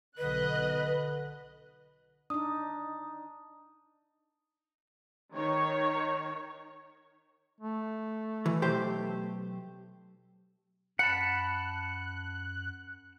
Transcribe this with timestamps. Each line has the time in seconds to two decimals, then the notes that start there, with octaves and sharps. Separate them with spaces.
0.18 B1 D3 B4 D#5 F#6
2.30 D4 D#4 D#6
5.34 D#3 C#5
7.60 A3
8.46 E3
8.62 B1 G4 C5
10.99 F#2 F#5 A5 B5 F#6